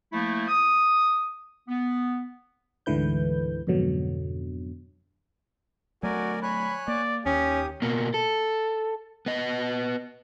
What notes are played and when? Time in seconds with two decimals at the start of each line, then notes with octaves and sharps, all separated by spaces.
0.12 F3 A3 A#3 E4
0.48 D#6
1.68 B3
2.86 D2 G#2 D3 E3 B4 G6
3.67 F2 G#2 B2 D3 F#3
6.03 F#3 A3 F#4 A#4 D5 G#5
6.43 C#5 G#5 B5 F#6
6.88 A#3 D5
7.26 D#2 C#4 G4 D#6
7.82 B2 A#3
8.14 A4
9.26 B3 D#5